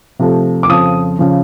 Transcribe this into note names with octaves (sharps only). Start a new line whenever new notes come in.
C3 F3 A3
D6
F2 C#3 F3 D#6
C#3 F3